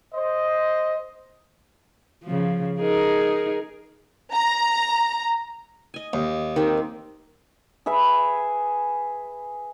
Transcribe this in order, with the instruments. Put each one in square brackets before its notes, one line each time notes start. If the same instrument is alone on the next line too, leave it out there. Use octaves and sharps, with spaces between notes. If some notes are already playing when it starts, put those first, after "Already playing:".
[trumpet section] C5 D#5
[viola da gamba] C#3 F3
D#4 G#4 A#4
[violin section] A#5
[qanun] D#5 G#5
[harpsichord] D#2
[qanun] D#3 C4 G4
[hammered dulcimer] G#4 B4 E5